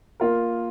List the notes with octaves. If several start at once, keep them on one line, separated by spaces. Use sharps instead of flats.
A#3 F4 A#4